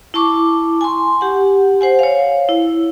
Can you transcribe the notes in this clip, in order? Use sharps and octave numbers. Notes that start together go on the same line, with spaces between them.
E4 A5 C#6 D6
G#5 C6
G4 F#5
C5 F#5 G#5
C#5 F5
E4